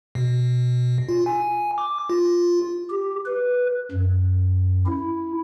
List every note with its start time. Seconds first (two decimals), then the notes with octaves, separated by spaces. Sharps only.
0.15 B2
1.09 F4
1.26 G#5
1.78 D6
2.10 F4
2.90 G4
3.25 B4
3.92 F#2
4.86 E4